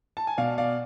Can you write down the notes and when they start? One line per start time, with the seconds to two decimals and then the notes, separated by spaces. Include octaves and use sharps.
0.17 A5
0.27 G#5
0.38 B2 D5 F5
0.58 D5 F5